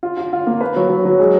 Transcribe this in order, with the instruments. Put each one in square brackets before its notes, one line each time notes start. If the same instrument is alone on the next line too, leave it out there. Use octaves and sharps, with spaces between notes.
[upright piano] F4
F4
F4
A#3
B4
F#3
F#3
F#3
G#3